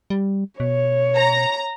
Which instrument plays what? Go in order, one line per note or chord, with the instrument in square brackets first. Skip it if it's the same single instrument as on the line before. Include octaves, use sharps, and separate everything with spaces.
[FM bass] G3
[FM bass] B2 [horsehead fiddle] C#5
[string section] A#5